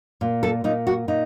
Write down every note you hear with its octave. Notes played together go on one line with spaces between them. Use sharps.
A#2
A4
A#2 D#4
F#4
A#2 D#4